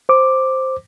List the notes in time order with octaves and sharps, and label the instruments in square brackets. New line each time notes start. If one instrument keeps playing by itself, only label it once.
[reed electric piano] C5 D6